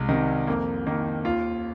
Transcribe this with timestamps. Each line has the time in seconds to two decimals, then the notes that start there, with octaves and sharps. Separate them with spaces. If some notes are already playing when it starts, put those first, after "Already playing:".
Already playing: C2 G#3
0.09 C3 D#3
0.47 F2 A#3
0.87 D#3 A#3
1.25 D#2 F4